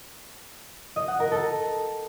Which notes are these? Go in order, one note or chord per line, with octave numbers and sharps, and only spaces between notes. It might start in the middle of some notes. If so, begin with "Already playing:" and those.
D#5
F#5
A#4
A4